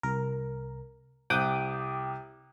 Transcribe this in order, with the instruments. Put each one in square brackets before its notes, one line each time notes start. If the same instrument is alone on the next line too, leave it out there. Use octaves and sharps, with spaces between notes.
[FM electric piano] C2 A#4
[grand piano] C2 F#6 [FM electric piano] G5 D6 D#6